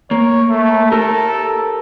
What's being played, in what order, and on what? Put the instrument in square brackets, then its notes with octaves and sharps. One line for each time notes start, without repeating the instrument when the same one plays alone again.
[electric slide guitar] A#3 [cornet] C#5
[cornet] A3
[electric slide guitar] G4 A#4 [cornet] A4